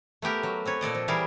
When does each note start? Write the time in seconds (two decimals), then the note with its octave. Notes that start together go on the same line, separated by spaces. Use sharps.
0.22 A3 B3 G4 A#4
0.43 F#3
0.65 C4 B4 C#5
0.81 A#2 A4 D5 D#5
0.95 F3
1.08 E3 G3 G#4 A#4 D5